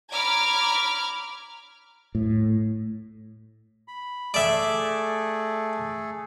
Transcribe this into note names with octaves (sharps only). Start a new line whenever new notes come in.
A#5 B5 D6 F6 G#6
A2
B5
A3 G#4 A4 D5 E5